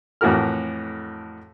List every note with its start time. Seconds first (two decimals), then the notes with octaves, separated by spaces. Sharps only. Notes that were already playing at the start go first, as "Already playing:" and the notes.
0.21 F2 A2 E3 F#4 A#4 F6